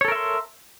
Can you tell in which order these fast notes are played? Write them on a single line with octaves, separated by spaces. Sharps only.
C#5 A4 A#4 E5 C6